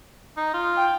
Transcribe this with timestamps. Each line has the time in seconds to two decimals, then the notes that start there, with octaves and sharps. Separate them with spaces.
0.37 D#4
0.54 F4
0.76 G5